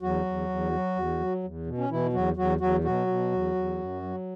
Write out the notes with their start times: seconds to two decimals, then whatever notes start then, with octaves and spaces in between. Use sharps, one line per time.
0.01 E2 F#3 F#4
0.26 E2
0.49 E2
0.72 F#3
0.96 E2
1.20 F#3
1.43 E2
1.66 B2
1.78 C#4
1.89 B2 E3 E4
2.13 E2 F#3 F#4
2.36 E2 F#3 F#4
2.60 E2 F#3 F#4
2.84 B2 F#3 F#4
3.07 B2
3.32 E2
3.55 E2
3.78 F#2
4.02 F#3